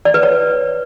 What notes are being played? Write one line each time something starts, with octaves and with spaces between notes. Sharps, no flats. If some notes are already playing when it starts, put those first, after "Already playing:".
D5
B4
C#5